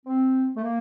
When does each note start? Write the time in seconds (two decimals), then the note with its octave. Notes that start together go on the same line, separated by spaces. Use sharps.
0.06 C4
0.57 A3
0.62 A#3